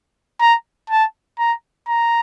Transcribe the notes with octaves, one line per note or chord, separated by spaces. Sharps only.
A#5
A5
A#5
A#5